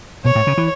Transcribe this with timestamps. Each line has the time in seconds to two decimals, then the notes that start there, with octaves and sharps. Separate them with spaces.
0.24 B2 C#5
0.35 A2
0.47 C#3
0.57 E3